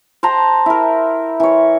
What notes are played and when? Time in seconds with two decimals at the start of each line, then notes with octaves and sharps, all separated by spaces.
0.23 C5 G5 A5 A#5
0.66 E4 A#4
1.40 E3 C#5